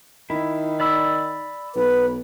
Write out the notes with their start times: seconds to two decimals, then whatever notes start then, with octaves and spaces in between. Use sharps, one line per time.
0.30 D#3 E4
0.80 D5 B5 E6
1.75 B1 B4